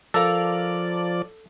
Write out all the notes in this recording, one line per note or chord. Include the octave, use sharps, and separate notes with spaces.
F3 A4 A#4 D5 F5